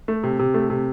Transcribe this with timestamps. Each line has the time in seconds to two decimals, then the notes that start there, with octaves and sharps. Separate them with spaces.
0.08 A3
0.23 C3
0.39 C3
0.54 A3
0.70 C3